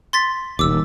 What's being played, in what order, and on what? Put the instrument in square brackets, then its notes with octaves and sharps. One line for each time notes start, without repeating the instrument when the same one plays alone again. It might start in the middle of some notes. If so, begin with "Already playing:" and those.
[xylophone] C6 A6 B6
[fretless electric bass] D#1 D#2 [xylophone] D6 E6